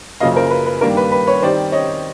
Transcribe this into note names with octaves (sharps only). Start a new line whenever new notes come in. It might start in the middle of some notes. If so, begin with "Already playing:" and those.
F#2 C#3 F3 A#3 D#5 F5
A#4 C5
B4
B4
G2 D#3 G3 A#3 D4 A#4
B4
B4
B4 C#5
D#3 G3 C4 D#4 C5 D5
C#5 D#5